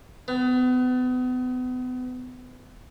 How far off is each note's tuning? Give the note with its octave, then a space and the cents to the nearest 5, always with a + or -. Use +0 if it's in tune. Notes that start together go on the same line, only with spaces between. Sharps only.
B3 +35